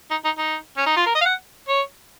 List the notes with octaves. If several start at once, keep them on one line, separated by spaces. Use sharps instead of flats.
D#4
D#4
D#4
C#4
D#4
F4
A#4
D#5
F5
F#5
C#5